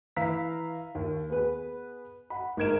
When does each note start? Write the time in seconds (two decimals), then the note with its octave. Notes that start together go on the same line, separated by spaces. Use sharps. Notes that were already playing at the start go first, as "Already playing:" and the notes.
0.17 E3 F5 A#5 E6 B6
0.95 D#2
1.30 B3 G#4 B4
2.30 F#5 B5
2.57 G#1 D#4 A#4 G#6 D7 E7